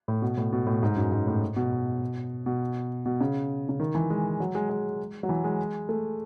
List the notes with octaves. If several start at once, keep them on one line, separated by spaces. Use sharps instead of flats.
A2
B2
A2
B2
A2
G#2
F#2
G#2
A2
B2
B2
B2
C#3
C#3
D#3
E3
G#3
F#3
G#3
G#3
F#3
E3
G#3
A3